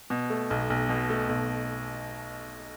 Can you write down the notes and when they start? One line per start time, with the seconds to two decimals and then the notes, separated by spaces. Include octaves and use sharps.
0.10 B2
0.30 A3
0.50 B1
0.70 B1
0.89 B2
1.10 A3
1.29 B1